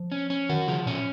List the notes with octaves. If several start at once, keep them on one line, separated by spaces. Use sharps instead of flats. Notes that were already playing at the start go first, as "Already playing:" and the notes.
Already playing: F3
C#4
C#4
D#3 F#4
C#3 F3
A#2 C#4